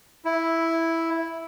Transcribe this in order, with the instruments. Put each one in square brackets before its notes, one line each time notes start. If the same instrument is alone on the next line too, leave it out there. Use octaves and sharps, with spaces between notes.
[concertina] E4